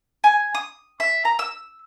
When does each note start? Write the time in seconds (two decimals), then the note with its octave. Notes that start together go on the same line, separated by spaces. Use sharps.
0.24 G#5
0.54 D#6
1.00 E5
1.25 A#5
1.39 E6